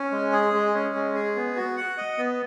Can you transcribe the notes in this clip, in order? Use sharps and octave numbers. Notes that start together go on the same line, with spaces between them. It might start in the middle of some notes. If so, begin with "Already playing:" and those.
Already playing: C#4
G#3
G#4
G#3
C#4
G#3
G#4
B3
F#4
F#5
D#5
B3